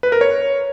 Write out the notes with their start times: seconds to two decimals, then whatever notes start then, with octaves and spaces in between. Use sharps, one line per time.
0.03 B4
0.12 A#4
0.21 C#5